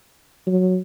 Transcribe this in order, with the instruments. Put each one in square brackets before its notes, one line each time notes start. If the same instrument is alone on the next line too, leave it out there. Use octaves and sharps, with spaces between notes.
[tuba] F#3